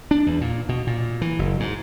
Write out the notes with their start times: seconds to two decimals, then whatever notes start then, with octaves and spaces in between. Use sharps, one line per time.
0.11 D4
0.27 E2
0.41 A#2
0.69 B2
0.87 A#2
1.21 E3
1.39 F#1
1.60 G#2